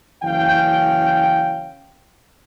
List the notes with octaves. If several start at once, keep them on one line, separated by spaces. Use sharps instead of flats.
F#1 E3 C#4 F5 G5